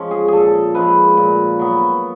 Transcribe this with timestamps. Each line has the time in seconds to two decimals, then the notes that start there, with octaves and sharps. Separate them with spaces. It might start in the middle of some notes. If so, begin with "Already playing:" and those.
Already playing: F3 G#3 C#4
0.11 G#4
0.28 A#2 G#4 A4
0.74 F3 G#3 C#4 B4
1.17 A#2
1.59 F#3 B3